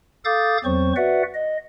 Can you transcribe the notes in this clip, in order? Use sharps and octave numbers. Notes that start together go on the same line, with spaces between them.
A4 F5 D6 D#6 G6 A6
E2 F#3 C4 C5 C#6
F#4 B4 D5 E5 F#5
D#5